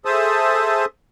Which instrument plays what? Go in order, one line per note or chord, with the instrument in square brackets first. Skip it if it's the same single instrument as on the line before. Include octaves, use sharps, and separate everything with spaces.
[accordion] G#4 A4 C5 E5 A5 D#6